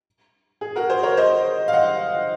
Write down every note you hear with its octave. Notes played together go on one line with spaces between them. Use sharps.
G#4
F#4 A#4
G#4 C5
A#4 C#5
C5 D#5
F5
D#5 F#5